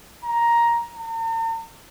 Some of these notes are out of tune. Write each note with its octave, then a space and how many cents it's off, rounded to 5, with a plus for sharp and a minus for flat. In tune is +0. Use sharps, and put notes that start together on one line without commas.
A#5 +10
A#5 -45